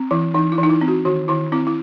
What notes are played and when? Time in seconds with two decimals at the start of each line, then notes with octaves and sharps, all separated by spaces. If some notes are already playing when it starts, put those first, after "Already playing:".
Already playing: C4
0.11 E3 E4
0.34 E3 D#4
0.52 E4
0.58 E3
0.63 D#4
0.69 E4
0.81 C4
0.88 F#4
1.05 D#3 F#4
1.28 D#3 E4
1.52 C4 E4
1.67 E4